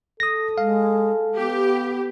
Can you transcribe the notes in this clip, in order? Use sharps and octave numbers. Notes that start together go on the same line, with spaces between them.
A4 D#6 A#6
G#3 F5
B3 G4